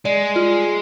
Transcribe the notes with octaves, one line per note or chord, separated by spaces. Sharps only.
G#3 D5
F4